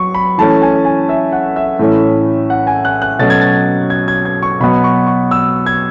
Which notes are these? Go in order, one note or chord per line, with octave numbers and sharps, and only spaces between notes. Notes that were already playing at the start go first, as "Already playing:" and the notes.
Already playing: F#3 C#6
B5
E3 A3 C#4 A5
G#5
G#5
E5
F#5
E5
A2 E3 A3 C#4
F#5
G#5
F#6
F#6
B2 F#3 A3 C#4 A6
G#6
A6
G#6
G#6
G#6
C#6
B2 F#3 B3 B5
C#6
C#6
E6
G#6